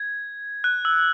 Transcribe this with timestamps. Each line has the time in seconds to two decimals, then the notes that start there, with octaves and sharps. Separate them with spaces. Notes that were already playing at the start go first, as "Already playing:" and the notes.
Already playing: G#6
0.64 F#6
0.85 E6